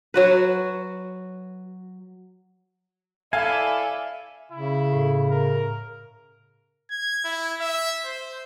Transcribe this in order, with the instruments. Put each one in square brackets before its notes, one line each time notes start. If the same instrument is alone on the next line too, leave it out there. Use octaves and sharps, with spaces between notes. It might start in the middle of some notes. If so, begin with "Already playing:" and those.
[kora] F#3 F#4 B4
[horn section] E4 A4 D5 [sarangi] E5 [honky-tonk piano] F5 [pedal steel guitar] G#5
[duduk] C#3 [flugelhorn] E4
[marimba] A2
[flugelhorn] A#4
[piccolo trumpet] G#6
E4
E5
C5